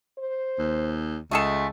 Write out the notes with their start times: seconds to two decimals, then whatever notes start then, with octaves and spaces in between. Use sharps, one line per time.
0.18 C5
0.59 D#2
1.31 C#2 G#3 A3 G#4 A4